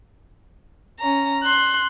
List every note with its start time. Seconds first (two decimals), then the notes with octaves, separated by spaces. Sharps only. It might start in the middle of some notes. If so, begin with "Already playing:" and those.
1.00 C#4 A#5
1.43 C6 F#6